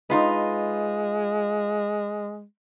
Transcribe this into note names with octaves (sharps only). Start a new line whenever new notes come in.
G#3 D#4 F4 B4